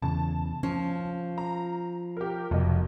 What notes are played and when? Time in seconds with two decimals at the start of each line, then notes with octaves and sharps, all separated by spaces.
0.02 E2 C#3 A5
0.63 F3 C#4
1.38 A#5
2.17 G4 A#4
2.51 F1 B1 D#5